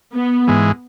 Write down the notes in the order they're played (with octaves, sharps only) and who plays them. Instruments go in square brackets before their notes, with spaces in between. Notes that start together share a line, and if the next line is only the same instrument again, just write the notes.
[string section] B3
[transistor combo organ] G#2 E3 G#3